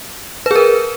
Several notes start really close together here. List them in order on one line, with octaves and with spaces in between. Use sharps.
B4 G#4 A#4